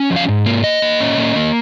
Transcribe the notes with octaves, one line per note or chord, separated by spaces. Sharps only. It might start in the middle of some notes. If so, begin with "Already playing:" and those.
Already playing: C#4
F3
F5
G#2
A#3
A#3 D#5
A#3
C#4
A#3
A#3